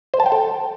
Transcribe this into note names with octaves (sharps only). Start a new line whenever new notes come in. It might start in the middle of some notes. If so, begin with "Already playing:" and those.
C5
A5
G5
A4